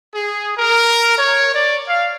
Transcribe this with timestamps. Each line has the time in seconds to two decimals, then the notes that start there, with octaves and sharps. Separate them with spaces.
0.14 G#4
0.57 A#4
1.17 C#5
1.54 D5
1.88 F5